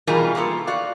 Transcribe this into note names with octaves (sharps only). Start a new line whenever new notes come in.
B2 E3 G3 F4 G#4 A#4
A#3 B3 F4 A4
F#4 D5 F5